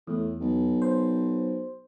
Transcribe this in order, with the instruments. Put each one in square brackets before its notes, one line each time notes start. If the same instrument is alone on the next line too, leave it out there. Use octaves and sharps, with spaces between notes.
[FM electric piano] E2 [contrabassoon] A2
[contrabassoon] B1
[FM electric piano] C5